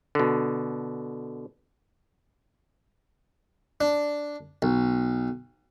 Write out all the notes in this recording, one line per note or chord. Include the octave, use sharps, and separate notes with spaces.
B2 D3
D4
B1